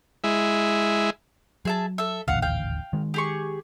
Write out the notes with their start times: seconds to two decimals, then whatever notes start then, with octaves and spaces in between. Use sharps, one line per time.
0.24 G#3 E4
1.65 F#3 G#4 E5 A5
1.98 A4 E5
2.28 D#1 A1 D2 F5 F#5
2.42 F5 G5
2.93 D#3 G#3
3.14 G4 G#4 C#6